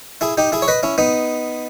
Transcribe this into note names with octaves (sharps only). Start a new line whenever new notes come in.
E4 G#4
D#4 G4
E4 G#4
C#5
B4 D#5
C#4 E4
B3 D#4